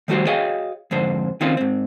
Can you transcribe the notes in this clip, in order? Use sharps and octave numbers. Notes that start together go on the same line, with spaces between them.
D#3 G3 A3 F#4 G4 C5
F#4 G#4 C#5 D#5 F5 G5
F2 G#2 D3 C5
D#3 C4 C#4 D#4 F4 C5
G#2 C4